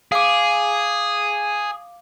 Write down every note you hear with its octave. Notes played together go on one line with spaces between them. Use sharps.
G#4 F5 D6